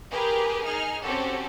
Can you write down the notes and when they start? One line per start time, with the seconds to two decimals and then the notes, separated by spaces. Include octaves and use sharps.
0.11 G4 G#4 A#4 B4
0.65 D#4 G#4 F6
1.03 C4 C#4 F#4 G4 A4